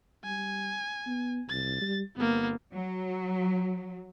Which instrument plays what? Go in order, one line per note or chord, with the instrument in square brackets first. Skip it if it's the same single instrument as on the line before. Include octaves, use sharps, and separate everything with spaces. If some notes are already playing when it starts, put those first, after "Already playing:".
[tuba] G3 [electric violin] G#5
[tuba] B3
[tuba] C2 [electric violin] A6
[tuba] G3
[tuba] G1 [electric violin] A#3 B3
[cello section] F#3